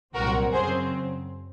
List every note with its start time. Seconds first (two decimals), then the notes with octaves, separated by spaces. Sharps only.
0.15 C2 A#2 F#3 C4 F#4 A#4
0.53 F#2 C#3 F#3 C4 G#4 C5